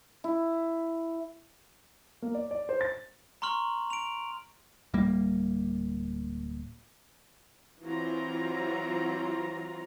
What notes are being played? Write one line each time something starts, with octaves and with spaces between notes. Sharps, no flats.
E4
A#3
D5
D5
C5
A6
A#5 C6 C#6 F6 F#7
D7 F7
D1 G3 A#3
E3 F#3 C4 F4 A#5